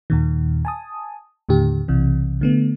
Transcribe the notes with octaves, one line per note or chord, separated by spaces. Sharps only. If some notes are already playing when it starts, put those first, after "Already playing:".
D#2 A#2 D#3
G#5 A5 D#6
D#2 A2 D3 G4
B1 C3 E3
D3 A3 B3